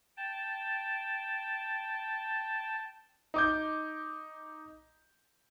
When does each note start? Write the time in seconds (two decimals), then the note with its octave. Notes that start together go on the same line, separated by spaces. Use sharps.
0.17 G5 A5
3.34 D#4 D6 G6